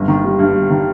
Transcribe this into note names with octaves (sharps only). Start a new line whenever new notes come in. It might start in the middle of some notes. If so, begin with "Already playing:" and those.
Already playing: G1
D#3
G3
G2
G1
D#3